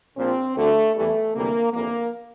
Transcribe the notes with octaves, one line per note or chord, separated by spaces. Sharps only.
A#1 A#2 F3 C4
D2 D3 G3 A3
E2 E3 G3 A3
D2 C3 E3 G3 A#3
G1 F2 E3 G3 A#3